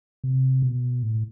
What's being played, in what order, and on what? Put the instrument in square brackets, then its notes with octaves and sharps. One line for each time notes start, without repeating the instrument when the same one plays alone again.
[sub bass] C3
B2
A2